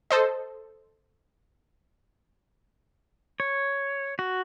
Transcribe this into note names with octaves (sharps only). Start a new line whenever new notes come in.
A4 C5 D#5
C#5
F#4